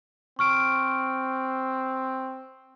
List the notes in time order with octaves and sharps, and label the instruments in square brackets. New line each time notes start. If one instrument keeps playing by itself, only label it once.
[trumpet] C4 [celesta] C#6 F6 D7